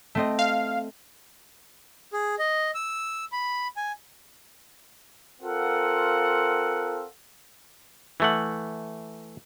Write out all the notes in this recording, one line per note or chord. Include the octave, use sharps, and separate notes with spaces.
A3 C4 D#5
F5
G#4
D#5
E6
B5
G#5
C4 F4 A4 A#4 F5 F#5
E3 A3 F#5